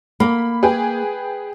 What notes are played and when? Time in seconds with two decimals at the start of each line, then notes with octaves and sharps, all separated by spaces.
0.20 A#3 B5
0.63 G#4 B4 G5